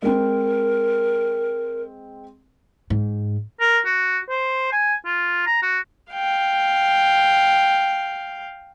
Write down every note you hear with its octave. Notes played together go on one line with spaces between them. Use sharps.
G#3 C4 A#4
G#2
A#4
F#4
C5
G#5
F4
A#5
F#4
F5 G5